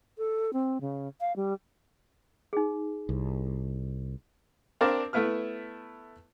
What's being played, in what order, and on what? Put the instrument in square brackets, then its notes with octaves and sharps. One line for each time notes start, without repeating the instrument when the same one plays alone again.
[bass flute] A4
C4
C#3
F5
G3
[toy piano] D#4 G#4
[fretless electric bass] C2
[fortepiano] C4 D4 A#4 D5 F5 A5
A3 B3 E4 B4 F6